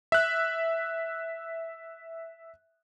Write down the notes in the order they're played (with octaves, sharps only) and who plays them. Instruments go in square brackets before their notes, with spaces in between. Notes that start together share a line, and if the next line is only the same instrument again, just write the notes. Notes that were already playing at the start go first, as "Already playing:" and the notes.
[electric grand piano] E5 F#6